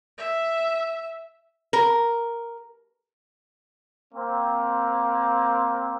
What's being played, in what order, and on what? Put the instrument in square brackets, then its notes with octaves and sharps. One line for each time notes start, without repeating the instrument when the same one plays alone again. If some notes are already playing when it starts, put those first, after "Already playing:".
[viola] E5
[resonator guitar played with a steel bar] A#4
[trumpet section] A#3 C4